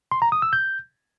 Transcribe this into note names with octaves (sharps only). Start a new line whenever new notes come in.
C6
A#5
D#6
E6
G6